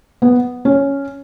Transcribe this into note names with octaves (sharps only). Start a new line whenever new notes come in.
B3
C#4